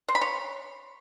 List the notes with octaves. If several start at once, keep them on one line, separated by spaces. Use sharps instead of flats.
C5
B5
C#5